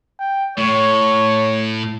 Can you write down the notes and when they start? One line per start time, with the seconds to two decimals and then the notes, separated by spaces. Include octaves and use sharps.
0.20 G5
0.58 A2 C#5